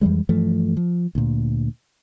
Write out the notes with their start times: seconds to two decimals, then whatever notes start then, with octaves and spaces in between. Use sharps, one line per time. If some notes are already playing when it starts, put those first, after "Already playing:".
0.01 F2 E3 G3 G#3
0.29 G2 E3 F3 A3
0.77 F3
1.15 D2 A#2